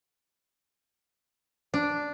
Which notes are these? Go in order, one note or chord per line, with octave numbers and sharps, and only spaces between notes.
D4